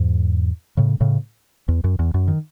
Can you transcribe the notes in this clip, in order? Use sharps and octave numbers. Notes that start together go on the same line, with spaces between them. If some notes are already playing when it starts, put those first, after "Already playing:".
Already playing: E2 G#2
A2 C#3
A2 C#3
E2
F#2
E2
F#2
D#3